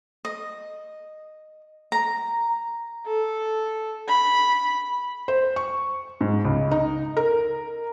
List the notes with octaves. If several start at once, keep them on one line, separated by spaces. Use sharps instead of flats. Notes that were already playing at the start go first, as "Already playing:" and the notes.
D#5
A#5
A4
B5
C5
C#6
G#2
C#2
D#4
A#4